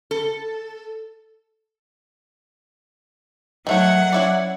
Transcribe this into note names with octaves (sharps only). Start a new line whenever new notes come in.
A4
D#3 F#3 A3 C#5 F#5
C#4 E4 D5